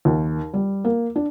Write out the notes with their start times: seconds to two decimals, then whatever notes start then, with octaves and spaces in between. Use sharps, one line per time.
0.05 D#2
0.54 G3
0.85 A#3
1.16 D4